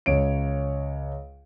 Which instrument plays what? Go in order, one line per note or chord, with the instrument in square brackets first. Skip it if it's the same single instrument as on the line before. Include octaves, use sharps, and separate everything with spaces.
[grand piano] C#2 C#5 D7